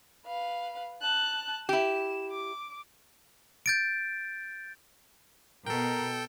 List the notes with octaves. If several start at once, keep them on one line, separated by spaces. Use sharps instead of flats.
B4 F5
A5 F#6
E4 G4 E7
D6
G6 A6 D7
B2 A4 A#4 G5